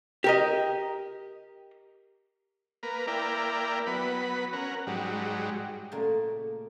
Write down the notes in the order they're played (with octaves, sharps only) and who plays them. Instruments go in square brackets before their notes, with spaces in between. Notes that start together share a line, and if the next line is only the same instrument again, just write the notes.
[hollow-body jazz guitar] G4 A#4 D#5
[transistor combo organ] A#3 A#4 B4
A#3 E4 A#4 D5 G5
F#3 B3 B5
C#4 A#4 F#5
G#2 F#3 G3
[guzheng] A#2 C#3 A3 A#3